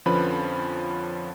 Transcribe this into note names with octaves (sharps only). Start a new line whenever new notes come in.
F2 D3 F3 C#4 B4 B5